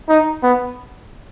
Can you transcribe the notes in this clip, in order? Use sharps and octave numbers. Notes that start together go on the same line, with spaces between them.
D#4
B3